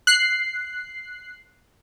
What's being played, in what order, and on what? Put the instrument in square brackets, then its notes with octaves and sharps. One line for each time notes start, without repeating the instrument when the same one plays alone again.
[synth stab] F#6 C7